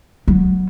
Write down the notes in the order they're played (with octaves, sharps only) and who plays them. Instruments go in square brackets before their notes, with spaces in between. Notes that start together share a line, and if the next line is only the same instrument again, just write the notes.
[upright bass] F#3